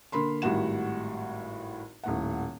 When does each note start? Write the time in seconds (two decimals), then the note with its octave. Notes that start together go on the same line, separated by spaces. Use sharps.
0.12 D3 A#3 B5 C6
0.42 G#1 A2 G3 F#4 F#5 E7
2.03 D#1 A2 F#5